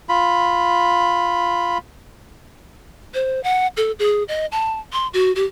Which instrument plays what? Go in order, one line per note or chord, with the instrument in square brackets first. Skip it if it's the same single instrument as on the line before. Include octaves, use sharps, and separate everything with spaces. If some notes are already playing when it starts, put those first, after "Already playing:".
[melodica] F4 B5
[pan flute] C5
F#5
A4
G#4
D#5
A5
C6
F#4
G4